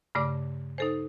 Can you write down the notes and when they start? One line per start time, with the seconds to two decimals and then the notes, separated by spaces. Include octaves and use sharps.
0.15 G2 C#3 A3 D5 D6
0.78 D#4 A4 C5